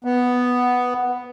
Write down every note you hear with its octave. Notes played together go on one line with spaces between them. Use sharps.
B3